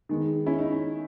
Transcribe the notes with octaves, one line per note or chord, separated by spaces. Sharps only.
D#3 G#3 B3
C#4 E4
D#4
C#4